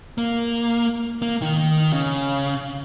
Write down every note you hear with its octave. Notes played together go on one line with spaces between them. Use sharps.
A#3
A#3
D#3 D#4
C#3